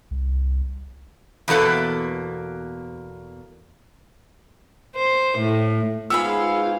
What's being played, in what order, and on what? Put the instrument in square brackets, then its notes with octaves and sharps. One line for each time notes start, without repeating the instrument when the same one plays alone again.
[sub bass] C2
[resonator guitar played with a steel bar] E2 B2 A#3 A4 B4
[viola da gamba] C5
A2
[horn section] G#2 F5 [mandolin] B3 G#4 B5 [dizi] F4 [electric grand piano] E6